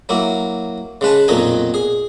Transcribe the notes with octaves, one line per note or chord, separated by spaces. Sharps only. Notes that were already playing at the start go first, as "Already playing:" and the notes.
F#3 A#3 E4
C#3 G#3 B4 A5
B1 F2 A#2 D#3 D#4 G#5
G#4